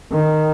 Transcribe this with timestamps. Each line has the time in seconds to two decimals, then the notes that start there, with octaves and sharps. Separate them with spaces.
0.12 D#3